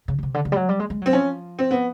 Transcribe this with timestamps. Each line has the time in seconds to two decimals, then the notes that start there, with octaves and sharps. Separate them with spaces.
0.08 C#3
0.19 B2
0.23 C3
0.34 D3
0.45 D3
0.52 G3
0.56 F#3
0.69 G3
0.80 G#3
0.90 G#3
1.02 F#3 C4
1.13 F3 C#4
1.59 C4
1.71 B3